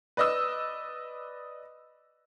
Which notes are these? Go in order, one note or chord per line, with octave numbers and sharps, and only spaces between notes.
B4 D5 D#5 D#6 E6